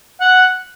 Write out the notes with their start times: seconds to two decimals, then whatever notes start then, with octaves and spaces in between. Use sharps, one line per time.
0.21 F#5